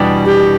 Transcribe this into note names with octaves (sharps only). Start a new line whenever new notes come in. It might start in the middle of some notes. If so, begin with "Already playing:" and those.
Already playing: E2 B2 G3 D4 G4
G4